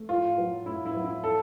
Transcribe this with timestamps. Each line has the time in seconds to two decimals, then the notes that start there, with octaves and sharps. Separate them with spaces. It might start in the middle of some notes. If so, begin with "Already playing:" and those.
Already playing: A3
0.09 A2 F4
0.38 F#3
0.66 A2 E4
0.85 E4
0.95 F#3
1.04 E4
1.24 A4